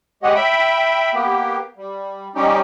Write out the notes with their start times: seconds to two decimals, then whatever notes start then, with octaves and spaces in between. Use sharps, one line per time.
0.23 G#3 G4 C#5 D#5 F#5
0.35 E5 G5 B5
1.14 A#3 B3 G4
1.77 G3
2.35 G3 C#4 D#4 G4